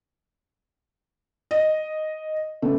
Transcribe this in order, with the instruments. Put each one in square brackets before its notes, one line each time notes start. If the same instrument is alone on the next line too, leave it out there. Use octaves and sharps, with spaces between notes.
[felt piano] D#5
[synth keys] C#3 B3 C#4 [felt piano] A3